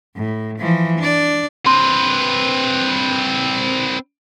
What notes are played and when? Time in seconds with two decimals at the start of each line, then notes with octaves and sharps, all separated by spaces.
0.16 A2
0.59 E3 F3
0.98 D4 D5
1.66 C4 B4 C6